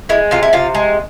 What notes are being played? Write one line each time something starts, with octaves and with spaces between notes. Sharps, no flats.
G#3 E4
C3 F4
E4
C3 F4
G#3